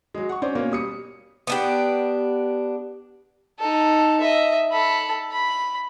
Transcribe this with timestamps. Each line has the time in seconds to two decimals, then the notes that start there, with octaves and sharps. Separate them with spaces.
0.14 F#3 G#3
0.29 F#5 C#6
0.42 C4 C#4 C5 D5
0.55 B2 A#3 C#4
0.71 G3 D#6 C#7
1.47 B3 D4 G4
3.59 D#4 A4
4.21 D#5 E5
4.72 A4 B5
5.32 B5